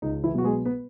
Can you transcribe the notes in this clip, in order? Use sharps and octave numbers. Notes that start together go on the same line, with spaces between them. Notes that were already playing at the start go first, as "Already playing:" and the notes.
C#2 D#4
E3 E4
B2 F#3 B3 F#4
G#3 G#4
B3 B4